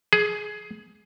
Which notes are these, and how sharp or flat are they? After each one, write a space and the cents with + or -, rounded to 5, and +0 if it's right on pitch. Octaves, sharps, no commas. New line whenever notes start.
G#4 +15